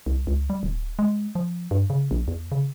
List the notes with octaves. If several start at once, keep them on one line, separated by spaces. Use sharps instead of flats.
C2
C#2
G3
D1
G#3
F3
G2
C#3
A#1
E2
C#3